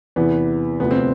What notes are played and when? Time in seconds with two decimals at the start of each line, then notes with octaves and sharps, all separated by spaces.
0.16 E2 C3 E3 B3
0.80 D2 C3 F3 B3
0.91 C4